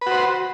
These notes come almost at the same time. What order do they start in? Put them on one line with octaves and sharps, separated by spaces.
B4 F#4 C5